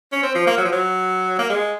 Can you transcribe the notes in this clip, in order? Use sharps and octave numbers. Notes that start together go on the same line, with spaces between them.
C#4
C4
F3
A#3
F#3
F3
F#3
A#3
G#3